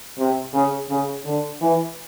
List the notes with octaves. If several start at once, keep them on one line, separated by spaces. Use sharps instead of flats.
C3
C#3
C#3
D3
E3